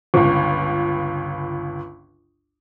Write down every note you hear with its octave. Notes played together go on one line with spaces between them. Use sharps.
G1 C#2